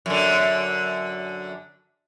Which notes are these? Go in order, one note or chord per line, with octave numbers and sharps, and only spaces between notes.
F#2 D3